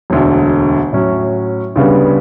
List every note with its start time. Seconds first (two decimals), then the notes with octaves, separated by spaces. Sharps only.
0.10 E1 D2 D3
0.93 A2 F#3 C#4
1.76 D2 C#3 G3 B3